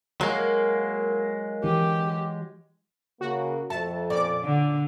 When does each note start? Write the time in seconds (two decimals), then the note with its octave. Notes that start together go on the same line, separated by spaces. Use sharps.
0.21 F#3 G#3 A#3
1.64 E3 G4
3.21 C#3 A#3 F#4
3.70 F2 A3 A5
4.10 A#2 C#4 D5 D6
4.44 D3